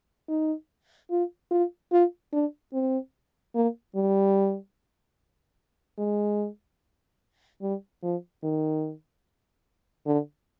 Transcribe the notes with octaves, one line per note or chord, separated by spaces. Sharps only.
D#4
F4
F4
F4
D4
C4
A#3
G3
G#3
G3
F3
D#3
D3